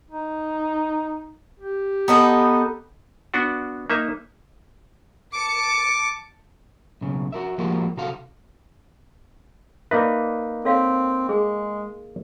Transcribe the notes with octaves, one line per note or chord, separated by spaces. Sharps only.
D#4
G4
B3 D#4 A4
B3 D4 F#4
A#3 D#4 E5
A5 D6 C#7
B1 C#3
F#4 A#4 E5
F3 G#3 A#3 F#4 G4
C3 F#4 A4 F5
A#3 D#4 B4 D5 E5
C4 A4 C#5 F5
G#3 G#4